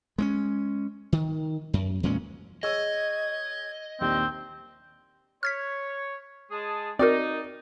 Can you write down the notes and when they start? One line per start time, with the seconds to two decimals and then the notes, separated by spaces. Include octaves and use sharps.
0.18 G#3 C4 C#4
1.12 D#3
1.73 F#2
2.03 E2 A#2 G#3 C#4
2.63 G#4 C#5 D#5 E6 G#6
4.01 A#1 D#2 C4 G4
5.43 C#5 F6 G#6 B6
6.51 G#3 G#4 A5
6.99 C4 D#4 F#4 A#4 D5